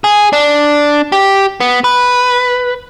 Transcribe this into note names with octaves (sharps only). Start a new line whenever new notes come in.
G#4
D4
G4
B3
B4